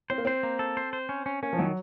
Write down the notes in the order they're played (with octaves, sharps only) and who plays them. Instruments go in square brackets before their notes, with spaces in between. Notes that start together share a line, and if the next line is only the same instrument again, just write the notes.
[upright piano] C4 [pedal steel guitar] C5
[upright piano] A#3
[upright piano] C4 [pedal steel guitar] C5
[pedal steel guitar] A#3
A4
C5
C5
C#4
C#4
[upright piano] A#3 [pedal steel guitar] C#4
[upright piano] F3
[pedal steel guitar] D#3 [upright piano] F#3